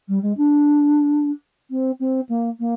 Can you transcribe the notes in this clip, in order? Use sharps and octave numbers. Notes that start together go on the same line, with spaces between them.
G3
G#3
D4
C4
C4
A#3
A#3